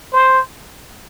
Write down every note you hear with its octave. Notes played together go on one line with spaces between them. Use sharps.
C5